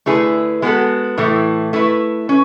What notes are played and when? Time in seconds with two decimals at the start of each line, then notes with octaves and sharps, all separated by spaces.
0.06 D3 A3 E4 G#4 B4
0.62 G#3 B3 F#4 A4
1.18 A2 E3 A3
1.73 A3 E4 B4
2.29 C#4